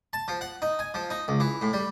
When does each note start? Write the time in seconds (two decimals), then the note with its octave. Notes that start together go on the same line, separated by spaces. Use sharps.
0.13 A5
0.28 F3
0.41 F#5
0.62 D#4
0.79 G#5
0.94 F3
1.10 D#4
1.28 C#2
1.40 E3
1.61 A2
1.73 G3